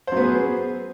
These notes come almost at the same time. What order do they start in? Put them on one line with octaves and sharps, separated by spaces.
C5 F#3 B3 G#4